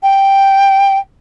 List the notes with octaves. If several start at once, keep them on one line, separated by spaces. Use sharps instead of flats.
G5